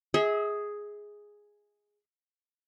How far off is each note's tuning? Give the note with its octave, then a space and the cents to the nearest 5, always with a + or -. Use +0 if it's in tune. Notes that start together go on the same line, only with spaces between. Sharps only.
G#4 +0 E5 -45